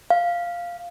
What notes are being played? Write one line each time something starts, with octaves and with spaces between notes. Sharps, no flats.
F5